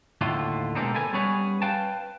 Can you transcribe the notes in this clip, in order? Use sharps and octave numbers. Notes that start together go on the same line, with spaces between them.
D#2 A2 D3 A3 F4
B2 G#3 A#3 C4 D4 D#4
A4 B4 G#5
G3 B3 C#4 G#4 B4 C#5
B4 F5 G5 A5